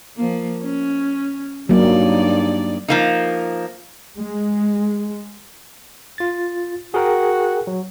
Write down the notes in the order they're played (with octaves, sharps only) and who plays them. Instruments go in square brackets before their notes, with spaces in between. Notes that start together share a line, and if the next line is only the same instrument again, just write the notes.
[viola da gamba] F3 A#3
C#4
[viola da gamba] G2 D#4 D5 [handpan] F#3 A#3
[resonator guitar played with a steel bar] F3 A#3 D#4
[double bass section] G#3
[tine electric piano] F4 A6
[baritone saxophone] F#4 [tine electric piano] G#4 A#4 G5
[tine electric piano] F#3